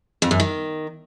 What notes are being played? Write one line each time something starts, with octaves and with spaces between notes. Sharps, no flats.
F2
F#2
D#3